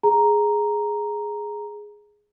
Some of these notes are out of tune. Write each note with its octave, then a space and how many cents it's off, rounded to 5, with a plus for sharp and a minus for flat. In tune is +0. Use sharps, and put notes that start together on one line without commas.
G#4 +0 A#5 +0